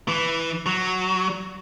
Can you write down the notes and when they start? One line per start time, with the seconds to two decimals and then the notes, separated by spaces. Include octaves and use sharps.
0.08 E3
0.66 F#3